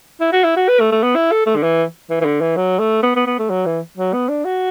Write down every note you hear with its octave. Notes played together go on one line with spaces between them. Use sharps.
E4
F#4
E4
F#4
B4
A3
A3
B3
E4
A4
A3
D3
E3
E3
E3
D3
E3
F#3
A3
B3
B3
B3
A3
F#3
E3
F#3
B3
D4
F#4